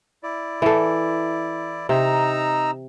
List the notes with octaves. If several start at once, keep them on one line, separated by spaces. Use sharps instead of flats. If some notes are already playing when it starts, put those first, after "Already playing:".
E4 D5
E3 A4
C3 D#4 A#5 E6